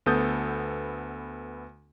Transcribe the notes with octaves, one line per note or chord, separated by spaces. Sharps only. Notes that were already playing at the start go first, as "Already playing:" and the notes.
D2 B3 A4 D#6 G6 A6